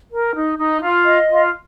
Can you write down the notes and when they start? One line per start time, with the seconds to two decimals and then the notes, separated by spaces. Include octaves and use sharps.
0.11 A#4
0.35 D#4
0.59 D#4
0.82 F4
1.06 D#5
1.29 F4